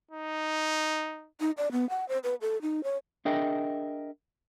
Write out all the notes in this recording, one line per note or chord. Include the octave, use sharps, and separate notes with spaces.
D#4
D#4
D5
B3
F#5
C5
B4
A4
D#4
C#5
D4 G#4 A#4 D#5 E5 G5